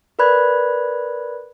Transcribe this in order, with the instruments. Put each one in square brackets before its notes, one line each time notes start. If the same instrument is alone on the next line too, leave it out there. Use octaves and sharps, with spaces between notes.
[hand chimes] A#4 B4 D5 B5 F#6 G#6